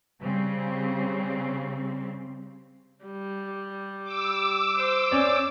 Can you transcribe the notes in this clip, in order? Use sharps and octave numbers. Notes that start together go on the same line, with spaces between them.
C#3 G3 C4
G3
D6 E6
C5
C#4 C#5 D5